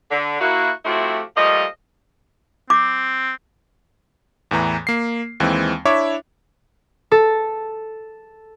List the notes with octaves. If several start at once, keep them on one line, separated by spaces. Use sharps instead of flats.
D3
A#3 E4 F#4
F3 A3 C4 E4 F#4 G4
F3 G3 A3 A#3 D#5
C4 D6
E2 A2 E3 A#5
A#3 C7
D#2 E3 G#3 C4
D4 E4 C#5 E5 D6
A4